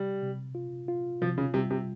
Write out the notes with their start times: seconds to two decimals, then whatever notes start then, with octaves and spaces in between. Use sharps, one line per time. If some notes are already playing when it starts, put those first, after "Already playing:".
Already playing: C3 G3
0.22 C3
0.55 F4
0.88 F4
1.21 C3 F3
1.38 C#3
1.54 C3 G3
1.71 C3